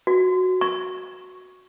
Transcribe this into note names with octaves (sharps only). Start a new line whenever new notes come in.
F#4
C#6